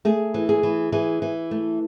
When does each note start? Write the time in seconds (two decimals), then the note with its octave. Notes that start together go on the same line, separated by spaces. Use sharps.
0.05 A3 G#4
0.34 E3
0.49 G#4
0.63 E3
0.92 E3 G#4
1.22 E3
1.51 A3